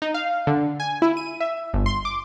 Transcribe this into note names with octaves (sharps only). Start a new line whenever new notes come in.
D#4
F5
D3
G#5
E4
D#7
E5
G1
C6
D6